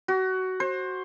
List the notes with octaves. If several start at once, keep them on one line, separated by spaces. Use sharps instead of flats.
F#4
C5